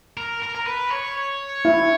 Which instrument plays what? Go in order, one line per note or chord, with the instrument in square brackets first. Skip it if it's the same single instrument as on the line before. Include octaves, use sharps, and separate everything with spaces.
[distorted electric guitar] A#4
A#4
A#4
B4
C#5
[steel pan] E4